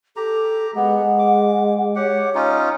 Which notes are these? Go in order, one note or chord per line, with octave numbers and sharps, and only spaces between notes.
G4 A4 A#5
G#3 B3 F#5
D6
G4 C#5 F#5
C#4 D#4 F4